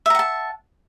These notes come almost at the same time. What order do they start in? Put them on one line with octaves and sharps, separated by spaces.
E5 A#5 F#5 A5